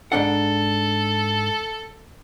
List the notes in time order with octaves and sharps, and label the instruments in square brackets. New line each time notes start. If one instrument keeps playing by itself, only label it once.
[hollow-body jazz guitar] G#2 D4 F#5 [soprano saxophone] A4